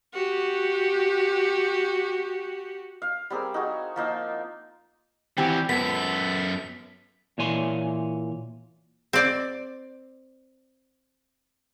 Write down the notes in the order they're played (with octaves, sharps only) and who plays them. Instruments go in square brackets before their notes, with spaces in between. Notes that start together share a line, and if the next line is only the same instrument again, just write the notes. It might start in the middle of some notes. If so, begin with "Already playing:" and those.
[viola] F#4 G4
[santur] F5
G3 C4 G#4 A#4
D#4 F#4 G#4
F3 A#3 D#4 E6
[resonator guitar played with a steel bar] E3 C4 G4 [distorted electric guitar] G3 F#4
[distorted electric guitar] F#2 A4 [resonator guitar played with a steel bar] B3 [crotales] B6
[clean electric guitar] A#2 E3 C#5 G#5 C6
[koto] C4 D5